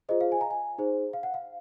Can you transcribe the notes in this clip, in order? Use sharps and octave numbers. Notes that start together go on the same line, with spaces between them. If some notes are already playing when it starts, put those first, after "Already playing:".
F4 G#4 C5 D#5
F5
G#5
A#5
G#5
D#4 G#4 C5
F5
F#5
F5